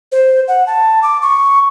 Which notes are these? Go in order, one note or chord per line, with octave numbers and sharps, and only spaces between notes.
C5
F#5
A5
D6
C#6